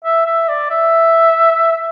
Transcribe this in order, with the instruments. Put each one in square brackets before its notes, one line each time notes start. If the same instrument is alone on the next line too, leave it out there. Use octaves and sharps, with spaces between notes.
[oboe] E5
E5
D5
E5